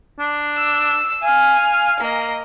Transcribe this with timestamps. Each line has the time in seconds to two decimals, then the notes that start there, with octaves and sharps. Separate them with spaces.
0.19 D4
0.57 E6
1.23 F5 G#5 F6
2.00 A#3 D#5